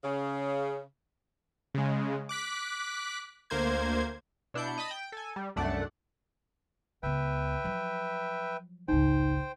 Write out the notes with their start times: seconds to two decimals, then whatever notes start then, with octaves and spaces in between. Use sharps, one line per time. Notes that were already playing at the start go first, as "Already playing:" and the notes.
0.04 C#3
1.74 C#3 G#3
2.29 D6 F#6 B6
3.50 D2 A#3 C5 G#6
4.54 B2 D4 E4 G6 C#7
4.78 D#5 A5 B5 D#6
4.91 G5
5.12 A4 G#5
5.36 G3
5.56 C2 F#2 A3 D4 D5 F#5
7.03 C#2 B3 B4 E5 G5
7.64 F3 F#3
8.88 G#1 C#2 D#4 C5 G5